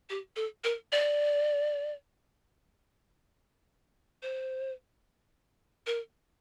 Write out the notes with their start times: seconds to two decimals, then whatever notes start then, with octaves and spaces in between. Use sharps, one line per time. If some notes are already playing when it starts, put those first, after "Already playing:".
0.10 G4
0.36 A4
0.64 A#4
0.92 D5
4.23 C5
5.87 A#4